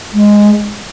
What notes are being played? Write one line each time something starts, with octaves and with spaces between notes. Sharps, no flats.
G#3